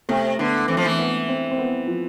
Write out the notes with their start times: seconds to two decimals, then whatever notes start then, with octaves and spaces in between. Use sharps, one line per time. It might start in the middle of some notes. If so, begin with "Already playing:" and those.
0.09 C3 A3
0.39 D3 B3
0.68 E3 C4
0.77 F3
0.85 E3 A3
0.99 B3
1.28 C4
1.51 C4
1.58 B3
1.87 F3